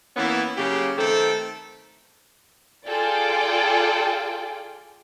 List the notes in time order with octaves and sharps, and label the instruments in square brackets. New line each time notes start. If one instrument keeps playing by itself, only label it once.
[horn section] E3 A#3 B3 C#4 E4
C#3 F#3 A#3 G4
D#3 A3 C4 A4
[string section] F4 G#4 A4 D5 G5